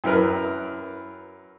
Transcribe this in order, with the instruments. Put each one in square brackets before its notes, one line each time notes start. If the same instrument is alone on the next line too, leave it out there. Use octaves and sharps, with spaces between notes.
[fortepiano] F#2 E4 A#4 B4